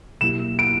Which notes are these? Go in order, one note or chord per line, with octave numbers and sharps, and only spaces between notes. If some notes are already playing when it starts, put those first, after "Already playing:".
B2 F#3 A#3 E4 G4 E7
D7